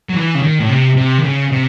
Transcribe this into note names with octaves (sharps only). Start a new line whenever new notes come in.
F#3
E3
C#3
D#3
A2
C3
C3
D#3
C#3
C3